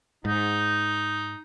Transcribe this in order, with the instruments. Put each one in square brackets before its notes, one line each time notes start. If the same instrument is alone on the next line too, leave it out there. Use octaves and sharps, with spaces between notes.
[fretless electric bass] G#2 [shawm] D#4